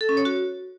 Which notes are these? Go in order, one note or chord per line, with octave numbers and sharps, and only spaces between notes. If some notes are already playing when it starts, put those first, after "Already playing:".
A4
C#4
C#5
F#4